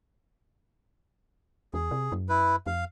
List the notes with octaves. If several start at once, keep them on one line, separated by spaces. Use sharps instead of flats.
E2 G#4
C3
F#2
E4 B4
F2 F5